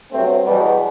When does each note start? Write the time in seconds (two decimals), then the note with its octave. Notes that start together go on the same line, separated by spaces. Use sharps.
0.12 G2 F#3 A3 C4
0.45 E2 B2 F#3 G3 B3